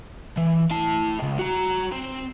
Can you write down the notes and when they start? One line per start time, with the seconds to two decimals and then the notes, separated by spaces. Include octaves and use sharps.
0.37 E3
0.71 E4 A5
1.19 C#2 D#3
1.39 F#4 A#5
1.92 C4